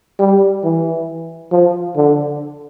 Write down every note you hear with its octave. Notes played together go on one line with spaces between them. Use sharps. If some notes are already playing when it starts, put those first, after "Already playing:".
G3
E3
F3
D3